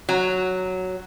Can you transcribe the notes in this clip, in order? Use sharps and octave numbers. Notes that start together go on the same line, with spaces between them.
F#3